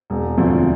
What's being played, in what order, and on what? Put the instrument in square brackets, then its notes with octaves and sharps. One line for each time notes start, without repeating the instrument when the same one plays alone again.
[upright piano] E1
D2 D3 F3